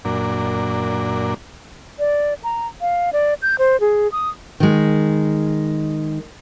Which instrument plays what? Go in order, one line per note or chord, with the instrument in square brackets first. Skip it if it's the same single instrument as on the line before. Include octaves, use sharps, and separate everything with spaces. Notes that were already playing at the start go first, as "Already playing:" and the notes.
[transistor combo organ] F#2 A#2 D4
[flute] D5
A#5
F5
D5
G6
C5
G#4
D#6
[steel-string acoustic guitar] D#3 G#3